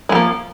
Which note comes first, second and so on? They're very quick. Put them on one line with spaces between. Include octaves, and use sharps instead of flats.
G#3 F3 A#3